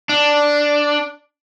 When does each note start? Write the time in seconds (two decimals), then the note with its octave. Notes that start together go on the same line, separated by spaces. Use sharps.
0.09 D4